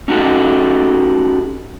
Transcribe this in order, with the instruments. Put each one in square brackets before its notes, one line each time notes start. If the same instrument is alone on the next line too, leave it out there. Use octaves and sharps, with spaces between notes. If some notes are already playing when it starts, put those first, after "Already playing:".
[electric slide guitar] C#4 D#4 F#4 G4 A4